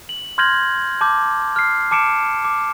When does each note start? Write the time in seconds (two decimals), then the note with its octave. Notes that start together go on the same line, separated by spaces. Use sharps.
0.09 F#7
0.38 C6 F6 G6 G#6 A#6 F#7
1.01 A5 D6 G6
1.56 F6 C7
1.91 A5 D6 C#7 D7 E7
2.45 D6